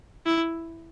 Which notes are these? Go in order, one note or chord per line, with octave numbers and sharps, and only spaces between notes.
E4